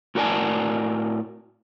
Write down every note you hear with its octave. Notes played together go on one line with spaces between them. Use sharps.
A2 F#4 A#4 D5 G#5 A5